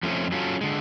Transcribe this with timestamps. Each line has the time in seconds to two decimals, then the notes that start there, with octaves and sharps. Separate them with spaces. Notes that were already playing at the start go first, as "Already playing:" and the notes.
0.03 F2 F3 A3 C#4
0.32 F#3 C#4 F4 A4
0.61 D3 G#3